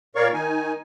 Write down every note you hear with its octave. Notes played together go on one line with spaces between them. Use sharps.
A#2 A#4 C#5 D5 F5 C#6
D#3 D#4 G#5